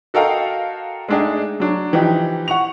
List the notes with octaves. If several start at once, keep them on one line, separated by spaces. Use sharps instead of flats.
F#4 A4 A#4 D#5 F5 G5
G#3 A3 D4 D#4 G#4
F#3 D4
E3 F3 D#4 G4
F#5 C#6 F7